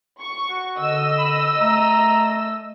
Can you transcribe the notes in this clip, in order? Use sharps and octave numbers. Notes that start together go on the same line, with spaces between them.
C#6
F#4
D3 D#5 E6
B5
A3 A#5